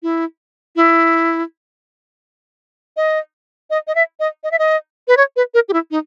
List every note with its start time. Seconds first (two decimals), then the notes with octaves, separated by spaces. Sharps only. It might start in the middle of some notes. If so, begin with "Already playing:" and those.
0.03 E4
0.76 E4
2.97 D#5
3.70 D#5
3.87 D#5
3.95 E5
4.20 D#5
4.44 D#5
4.51 E5
4.59 D#5
5.08 B4
5.17 C#5
5.36 B4
5.54 A#4
5.69 G4
5.73 E4
5.91 D#4